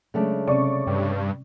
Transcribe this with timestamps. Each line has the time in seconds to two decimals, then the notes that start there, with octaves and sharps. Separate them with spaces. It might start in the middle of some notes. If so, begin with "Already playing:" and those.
0.14 C#3 F#3 G#3 A3 D4
0.47 C3 C4 C#4 D5 C#6
0.87 G2